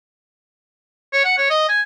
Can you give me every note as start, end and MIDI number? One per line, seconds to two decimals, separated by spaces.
1.13 1.24 73
1.24 1.37 78
1.38 1.49 73
1.50 1.68 75
1.69 1.81 80